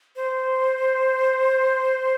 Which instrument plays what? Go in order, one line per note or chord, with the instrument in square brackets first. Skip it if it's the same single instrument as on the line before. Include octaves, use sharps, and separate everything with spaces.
[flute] C5